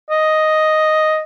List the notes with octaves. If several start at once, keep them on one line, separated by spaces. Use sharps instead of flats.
D#5